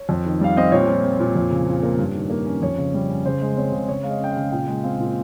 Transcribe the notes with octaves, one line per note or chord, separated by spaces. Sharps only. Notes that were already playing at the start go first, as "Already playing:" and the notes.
Already playing: C#5
F2
D#3
G3 F5
C4 D#5
A#2 C#5
F3
C4
A#2
F2
C#3
F3
A#3
G2
D#3
A#3
C#4
F2 C#5
C#3
G3
C#4
C#3 C5
G#3
C4 C#5
C#3
C#3 C#5
G#3 F5
D#5
C#4 G5
F5
C#3
A#2 G5
G#3
C4 F5
A#2